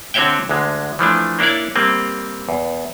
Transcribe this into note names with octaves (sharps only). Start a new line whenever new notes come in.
D3 C4 F#4 C#5 E5 G5
D2 D3 G#3
E3 F3 A3 D4
A#3 D4 E4 C#5 D5
G3 A#3 C4
E2